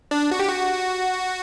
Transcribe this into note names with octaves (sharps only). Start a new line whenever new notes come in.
D4
F#4
G4
F#4